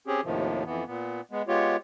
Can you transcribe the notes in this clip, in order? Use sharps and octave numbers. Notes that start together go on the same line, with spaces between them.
C4 C#4 G4 G#4
D#2 A2 C3 D#3 F3
F2 E3 B3
A#2 B3
G#3 B3
G#3 B3 F4 G4 C#5